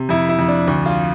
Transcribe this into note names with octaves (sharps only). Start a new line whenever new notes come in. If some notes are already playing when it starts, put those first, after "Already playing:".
Already playing: C3
F2 E4
E4
F2
D4
D2
F4